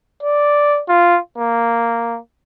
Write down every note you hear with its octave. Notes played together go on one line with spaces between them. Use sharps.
D5
F4
A#3